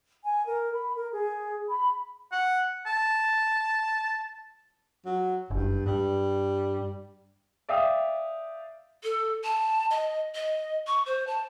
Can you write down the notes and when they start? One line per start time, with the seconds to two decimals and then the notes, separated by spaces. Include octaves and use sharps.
0.23 G#5
0.46 A#4
0.74 B5
0.95 A#4
1.11 G#4
1.68 B5
2.32 F#5
2.86 A5
5.05 F#3
5.50 F#1 G2
5.86 G2 G3
7.69 D5 E5 F5 G5 D#6
9.03 A4
9.44 A5
9.91 D#5
10.35 D#5
10.87 C#6
11.06 C5
11.27 A5